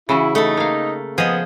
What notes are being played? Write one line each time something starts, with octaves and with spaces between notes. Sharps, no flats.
C#3 E3 E4 F#4
A3 D#4 A4
A#3 F5
F3 B3 G#4 D#5